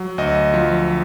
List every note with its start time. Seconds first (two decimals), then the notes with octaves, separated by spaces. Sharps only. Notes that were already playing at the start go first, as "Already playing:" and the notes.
Already playing: F#3
0.18 D2 D#5
0.54 F3